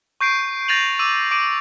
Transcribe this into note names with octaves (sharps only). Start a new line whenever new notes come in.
C#6 G6 C7 D7 D#7
G6 A6 A#6 D#7 F7 F#7
D6 E6 D#7
D6 D7 D#7